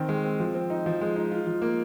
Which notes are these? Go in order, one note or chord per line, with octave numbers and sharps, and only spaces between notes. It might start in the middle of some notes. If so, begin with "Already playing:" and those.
Already playing: D#3 C4
G#3
C4
F3
C4
D#4
F3
G#3
D#4
F4
F3
A#3